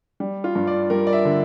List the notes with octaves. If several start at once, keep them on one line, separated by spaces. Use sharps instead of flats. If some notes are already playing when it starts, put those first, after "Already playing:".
G3
F4
G2
D5
G3 A#4
D5
E5
D3